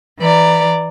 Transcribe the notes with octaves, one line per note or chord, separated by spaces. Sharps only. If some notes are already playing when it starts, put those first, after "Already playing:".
E3 D5 A#5